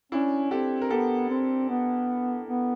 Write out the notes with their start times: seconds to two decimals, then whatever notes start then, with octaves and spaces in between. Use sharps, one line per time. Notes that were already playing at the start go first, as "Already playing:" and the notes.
0.12 C#4 D4 E4
0.51 C4 G4 A4
0.81 A#4
0.90 B3 G4 A4
1.29 C4
1.69 B3
2.48 B3